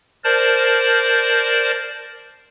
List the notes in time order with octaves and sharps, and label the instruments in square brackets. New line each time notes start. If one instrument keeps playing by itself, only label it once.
[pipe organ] A#4 C5 D5 A5